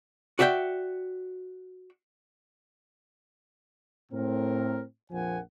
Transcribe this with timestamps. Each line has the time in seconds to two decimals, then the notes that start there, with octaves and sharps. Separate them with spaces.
0.39 F#4 D5 E5 F5 G5
4.12 A2 C4 A#4
5.10 A#1 F2 F3 A#3 F#5 G#5